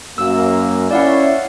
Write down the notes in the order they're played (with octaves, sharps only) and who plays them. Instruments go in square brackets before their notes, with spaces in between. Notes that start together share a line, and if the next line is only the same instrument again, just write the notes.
[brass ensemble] F#2 A#3 [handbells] E6
[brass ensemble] C#4 E4 [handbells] D5 F5 F#5